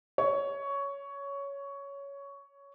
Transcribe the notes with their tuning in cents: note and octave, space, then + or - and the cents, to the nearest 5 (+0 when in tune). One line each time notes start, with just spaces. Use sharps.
C#5 +10